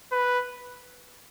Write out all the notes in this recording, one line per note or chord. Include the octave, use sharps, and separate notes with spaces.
B4